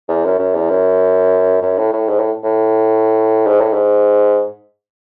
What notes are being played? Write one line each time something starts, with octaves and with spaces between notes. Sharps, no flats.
E2
F#2
F#2
E2
F#2
F#2
A2
A2
G#2
A2
A2
G#2
A2
G#2